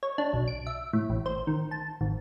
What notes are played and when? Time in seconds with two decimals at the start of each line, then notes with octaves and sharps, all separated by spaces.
0.03 C#5
0.18 D4
0.33 B1
0.48 D7
0.67 E5
0.93 A2
1.10 A1
1.26 C5
1.47 D#3
1.71 A5
2.01 G#1